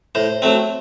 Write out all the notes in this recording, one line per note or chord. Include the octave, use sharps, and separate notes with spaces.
A2 C5
F#3 A3 C4